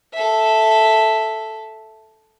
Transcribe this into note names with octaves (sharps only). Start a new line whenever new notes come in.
A4 E5